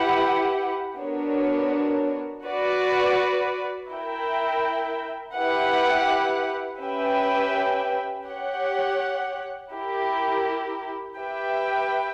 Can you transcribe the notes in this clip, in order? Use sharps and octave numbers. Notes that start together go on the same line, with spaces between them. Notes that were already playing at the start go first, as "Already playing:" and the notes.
Already playing: E4 G4 B4 F#5
B3 D4 F#4 A#4 C#5
F#4 B4 D5
E4 A#4 E5 G5
E4 G4 B4 F#5
C#4 G4 B4 E5 G5
G4 C#5 F#5
E4 G4 A#4
G4 B4 E5 G5